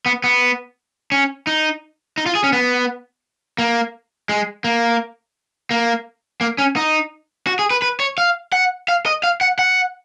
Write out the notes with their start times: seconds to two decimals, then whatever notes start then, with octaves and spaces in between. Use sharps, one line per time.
0.06 B3
0.24 B3
1.12 C#4
1.47 D#4
2.18 D#4
2.26 F4
2.35 G#4
2.44 C#4
2.53 B3
3.58 A#3
4.29 G#3
4.64 A#3
5.71 A#3
6.41 A#3
6.58 C#4
6.76 D#4
7.47 F#4
7.59 G#4
7.70 B4
7.82 B4
8.00 C#5
8.18 F5
8.52 F#5
8.88 F5
9.06 D#5
9.24 F5
9.41 F#5
9.59 F#5